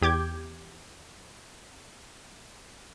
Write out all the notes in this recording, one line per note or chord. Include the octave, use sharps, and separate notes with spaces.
E2 G4 D6 G6 G#6